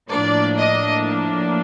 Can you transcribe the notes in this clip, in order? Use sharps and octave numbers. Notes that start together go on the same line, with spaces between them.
A2 F3 A#3 D4 D5
D#5